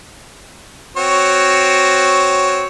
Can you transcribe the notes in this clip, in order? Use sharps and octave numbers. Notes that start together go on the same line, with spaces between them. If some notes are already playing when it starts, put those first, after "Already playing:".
C4 F#4 C#5